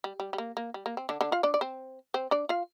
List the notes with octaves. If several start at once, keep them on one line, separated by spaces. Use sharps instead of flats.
G3
G3
G3
A#3
A#3
G3
A#3
C4
D3 D4
D3 D4
F4 F5
D4 D5
D5
C4 C5
C4 C5
D4 D5
F4 F5